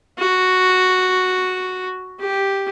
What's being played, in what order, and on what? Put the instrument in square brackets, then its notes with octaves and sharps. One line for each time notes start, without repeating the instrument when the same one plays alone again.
[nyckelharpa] F#4
G4